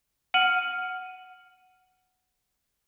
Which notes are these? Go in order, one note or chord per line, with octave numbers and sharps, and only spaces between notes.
F#5 F6 D#7 F#7